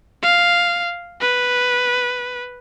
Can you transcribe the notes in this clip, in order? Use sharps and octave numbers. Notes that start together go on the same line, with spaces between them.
F5
B4